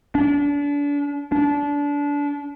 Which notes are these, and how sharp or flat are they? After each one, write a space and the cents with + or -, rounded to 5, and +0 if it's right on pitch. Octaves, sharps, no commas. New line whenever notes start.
D4 -35
D4 -25